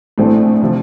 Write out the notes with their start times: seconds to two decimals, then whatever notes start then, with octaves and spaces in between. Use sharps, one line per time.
0.18 A#1 A2 A3 C4
0.62 C3 F3